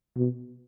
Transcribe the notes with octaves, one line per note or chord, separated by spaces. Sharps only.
B2